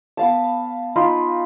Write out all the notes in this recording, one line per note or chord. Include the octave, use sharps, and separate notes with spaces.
B3 F5 A5
D#4 F4 B5